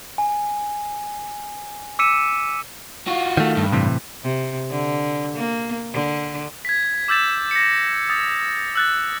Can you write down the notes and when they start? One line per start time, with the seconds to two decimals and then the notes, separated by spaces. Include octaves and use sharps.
0.18 G#5
1.99 D6 E6 B6 C#7 D#7 E7
3.08 F4 F#4
3.37 D#3 A3
3.57 G2
3.72 A2 C3 E3
4.23 C3
4.71 D3
5.36 A#3
5.94 D3
6.65 G#6 B6
7.08 D6 E6 G6 A6 E7
7.51 A#6 C#7
8.10 D#6 A6
8.75 E6 F#6 A6